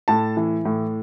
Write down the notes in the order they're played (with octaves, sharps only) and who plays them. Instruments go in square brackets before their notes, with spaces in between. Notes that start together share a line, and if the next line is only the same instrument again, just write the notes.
[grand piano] A2 A5
E3
A2